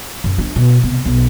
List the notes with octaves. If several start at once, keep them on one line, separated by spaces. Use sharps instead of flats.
F#2
D4
B2
C3
B1